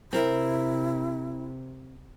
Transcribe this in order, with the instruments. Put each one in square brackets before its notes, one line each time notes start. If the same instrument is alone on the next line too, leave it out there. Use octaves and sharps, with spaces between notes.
[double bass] C3 [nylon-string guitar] C4 A#4 [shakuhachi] E4